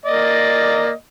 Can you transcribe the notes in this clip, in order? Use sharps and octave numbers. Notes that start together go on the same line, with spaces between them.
A#3 D5 D#5